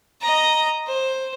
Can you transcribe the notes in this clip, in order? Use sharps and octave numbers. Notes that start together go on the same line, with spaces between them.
D#5 A#5
C5